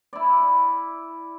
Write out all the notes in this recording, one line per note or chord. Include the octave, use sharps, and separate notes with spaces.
E4 D5